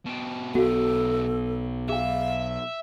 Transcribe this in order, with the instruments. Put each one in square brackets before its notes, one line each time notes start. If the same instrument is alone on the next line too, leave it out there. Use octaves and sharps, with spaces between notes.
[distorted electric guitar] B2 G4
[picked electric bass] B1 B3 [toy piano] F#4 F5 [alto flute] A4
[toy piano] G#4 G5 [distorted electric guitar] E5 [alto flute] F5